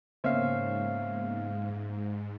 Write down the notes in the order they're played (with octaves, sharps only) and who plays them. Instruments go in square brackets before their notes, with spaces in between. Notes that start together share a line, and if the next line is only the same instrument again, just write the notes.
[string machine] G#2 [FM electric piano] C#3 A#3 B3 [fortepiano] C#4 E5 [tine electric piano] C5 F5